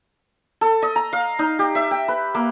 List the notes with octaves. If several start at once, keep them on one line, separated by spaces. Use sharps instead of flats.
A4
D#5
A#5
F5
D#4
G4
E5
G5
B4
A#3